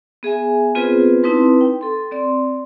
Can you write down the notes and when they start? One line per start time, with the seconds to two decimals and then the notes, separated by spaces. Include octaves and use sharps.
0.23 B3 G#4 E5 G#5
0.75 B3 C4 F4 G#4 B4 C5
1.23 C4 D#4 E4 B4 A5 C6
1.61 G5
1.81 A4 C6
2.12 C4 D5 C6